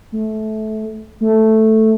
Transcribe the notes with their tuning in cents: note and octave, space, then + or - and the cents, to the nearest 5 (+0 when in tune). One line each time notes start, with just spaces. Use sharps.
A3 -20
A3 +0